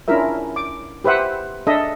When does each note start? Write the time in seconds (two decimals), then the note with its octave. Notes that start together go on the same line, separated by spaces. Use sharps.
0.08 C#4 D4 E4 F4 A#4 E5
0.56 D6
1.04 G4 B4 C5 E5 F#5
1.67 D4 A4 D#5 E5